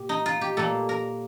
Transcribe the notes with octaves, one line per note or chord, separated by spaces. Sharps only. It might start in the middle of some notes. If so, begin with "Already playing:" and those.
Already playing: A#2 G4
D#4
F4
G4
A#2 G3 A#3 A4
A#4